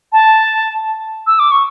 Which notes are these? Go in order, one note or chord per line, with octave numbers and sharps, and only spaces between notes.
A5
E6
D6
C#6